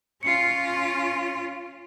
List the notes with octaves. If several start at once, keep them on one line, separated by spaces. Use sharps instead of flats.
C#4 F4 C7 C#7